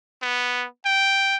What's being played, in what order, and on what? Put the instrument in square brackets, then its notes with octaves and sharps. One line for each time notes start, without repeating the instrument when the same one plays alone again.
[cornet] B3
G5